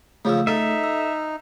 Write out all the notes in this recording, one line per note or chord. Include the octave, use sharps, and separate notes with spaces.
C#3 F3 A3 E6
D#4 A4 E5
E6